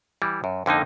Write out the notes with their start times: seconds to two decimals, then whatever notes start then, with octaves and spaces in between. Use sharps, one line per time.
0.22 E3 G3
0.44 F#2
0.66 F2 D3 A#3 D#4